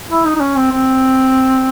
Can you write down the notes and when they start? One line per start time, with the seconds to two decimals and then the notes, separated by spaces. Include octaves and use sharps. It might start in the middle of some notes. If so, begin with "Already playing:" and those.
0.10 E4
0.25 D#4
0.36 D#4
0.40 C#4
0.56 C4
0.72 C4